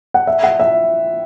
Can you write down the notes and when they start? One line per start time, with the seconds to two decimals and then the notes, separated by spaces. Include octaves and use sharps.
0.14 F#5
0.27 E5
0.43 F#5
0.60 E5